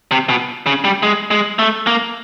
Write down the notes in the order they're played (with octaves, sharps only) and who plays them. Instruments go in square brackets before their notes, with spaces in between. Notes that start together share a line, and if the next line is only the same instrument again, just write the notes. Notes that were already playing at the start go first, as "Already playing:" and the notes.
[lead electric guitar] C3
B2
C#3
G3
G#3
G#3
A3
A#3